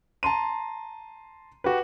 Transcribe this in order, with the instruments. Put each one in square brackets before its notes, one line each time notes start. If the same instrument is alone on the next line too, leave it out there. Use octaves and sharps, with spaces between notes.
[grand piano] A5 A#5 C6 D#7
F#4 G4 B4